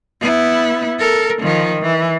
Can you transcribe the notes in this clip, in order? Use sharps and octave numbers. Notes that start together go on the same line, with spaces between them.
B3 E4
A4 A#4
D#3 F3
E3